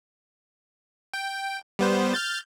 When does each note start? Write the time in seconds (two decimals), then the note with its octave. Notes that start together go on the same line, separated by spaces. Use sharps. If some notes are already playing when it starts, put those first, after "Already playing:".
1.14 G5
1.79 G3 B3 C5
2.14 F6 G6 A6